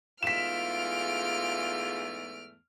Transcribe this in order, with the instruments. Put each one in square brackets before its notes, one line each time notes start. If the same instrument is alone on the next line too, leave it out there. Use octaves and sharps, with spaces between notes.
[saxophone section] E2 G#2 A3 [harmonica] F4 [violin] F6 D7 [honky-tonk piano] B6 E7